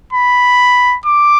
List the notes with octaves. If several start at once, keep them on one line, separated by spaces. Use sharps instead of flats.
B5
D6